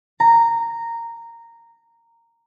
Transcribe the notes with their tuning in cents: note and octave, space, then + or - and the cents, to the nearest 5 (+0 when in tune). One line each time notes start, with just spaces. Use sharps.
A#5 -10